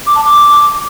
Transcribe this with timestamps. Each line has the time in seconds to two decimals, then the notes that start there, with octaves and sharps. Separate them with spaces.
0.07 D6
0.16 A5
0.24 D6